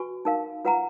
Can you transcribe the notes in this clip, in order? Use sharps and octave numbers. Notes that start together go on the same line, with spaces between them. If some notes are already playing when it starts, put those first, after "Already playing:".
Already playing: F#4 B4 G#5 C#6
D#4 A#4 F5
F4 B4 F#5 A#5